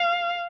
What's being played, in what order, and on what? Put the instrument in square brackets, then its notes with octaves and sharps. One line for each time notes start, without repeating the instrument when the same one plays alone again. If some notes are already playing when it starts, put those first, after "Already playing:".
Already playing: [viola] F5